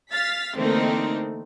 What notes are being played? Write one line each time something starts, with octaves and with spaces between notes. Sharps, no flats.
F5 A6 B6
D3 E3 A3 A#3 C4 D#4